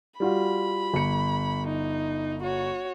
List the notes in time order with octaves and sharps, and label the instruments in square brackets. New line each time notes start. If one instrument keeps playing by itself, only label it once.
[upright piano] G3 F4 F#4 [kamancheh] B5
[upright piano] G1 C#7
[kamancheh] D#4
F#4 C#5